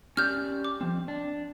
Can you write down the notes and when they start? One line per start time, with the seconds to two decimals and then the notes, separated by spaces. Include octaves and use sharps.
0.17 C#4 G4 D5 F6 G6
0.64 D6
0.81 F3 C4
1.08 D4